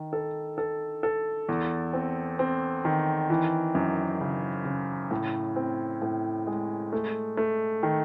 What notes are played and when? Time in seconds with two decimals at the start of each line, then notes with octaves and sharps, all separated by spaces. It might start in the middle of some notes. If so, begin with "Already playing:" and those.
Already playing: D#3
0.13 A4
0.58 A4
1.03 A4
1.49 E2
1.93 C4
2.39 C4
2.85 D#3
3.30 E3
3.75 F#2
4.20 C#3
4.65 C#3
5.11 A2
5.56 C4
6.02 A2
6.47 G#3
6.93 A3
7.37 A3
7.83 D#3